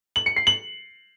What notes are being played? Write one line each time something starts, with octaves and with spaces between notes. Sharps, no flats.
F#7
C#7
C7
F#7